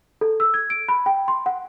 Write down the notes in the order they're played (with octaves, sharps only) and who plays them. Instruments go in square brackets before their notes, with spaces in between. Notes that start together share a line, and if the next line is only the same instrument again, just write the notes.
[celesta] A4
E6
G#6
D7
B5
G5
C6
F#5